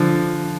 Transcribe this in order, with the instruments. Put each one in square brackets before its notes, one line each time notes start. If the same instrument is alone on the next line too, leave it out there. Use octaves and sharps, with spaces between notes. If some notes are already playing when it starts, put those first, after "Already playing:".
Already playing: [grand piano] D3 F3